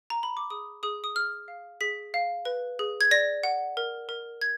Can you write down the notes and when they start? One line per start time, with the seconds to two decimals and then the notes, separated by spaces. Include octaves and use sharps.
0.10 A#5
0.23 B5
0.37 D6
0.50 G#4 D#6
0.83 G#4 D#6
1.04 D#6
1.15 G#4 F6
1.48 F5
1.81 G#4 B6
2.14 F5
2.45 B4
2.79 G#4
3.01 G#6
3.11 D5 A#6
3.43 F#5
3.77 A#4
4.09 A#4
4.41 G#6